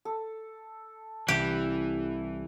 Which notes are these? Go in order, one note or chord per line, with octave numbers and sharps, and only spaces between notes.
A4
C2 E3 G4